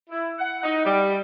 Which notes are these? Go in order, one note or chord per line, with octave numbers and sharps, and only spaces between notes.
E4
F#5
D#4
G3